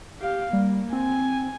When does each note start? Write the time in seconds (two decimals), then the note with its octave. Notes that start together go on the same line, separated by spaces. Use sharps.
0.20 G4 F5
0.53 G3 A#3
0.93 C4 G#5